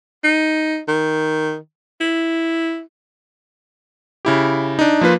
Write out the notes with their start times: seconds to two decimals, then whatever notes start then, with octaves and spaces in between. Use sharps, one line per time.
0.24 D#4
0.88 D#3
2.01 E4
4.25 C#3 E4 G4
4.79 D4 D#4
5.01 F3 A#3 F4 B4